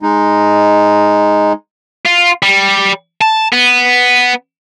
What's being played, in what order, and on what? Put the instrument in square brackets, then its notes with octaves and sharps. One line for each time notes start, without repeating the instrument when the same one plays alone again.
[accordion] G#3 D#4
[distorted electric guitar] F4
G3
A5
B3